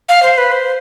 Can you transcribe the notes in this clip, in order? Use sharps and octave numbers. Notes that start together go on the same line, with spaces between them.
F5
C5
B4
C5